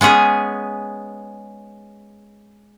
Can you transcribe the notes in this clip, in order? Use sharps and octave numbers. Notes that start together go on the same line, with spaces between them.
G#3 B3 C#4 G#4